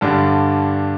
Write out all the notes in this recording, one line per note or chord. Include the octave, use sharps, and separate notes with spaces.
G2 D3 G3 D4 A4